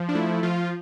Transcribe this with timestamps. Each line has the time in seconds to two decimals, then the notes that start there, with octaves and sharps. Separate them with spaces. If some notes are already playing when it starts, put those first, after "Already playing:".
Already playing: F3
0.09 D4
0.15 A3 E4
0.43 F3 F4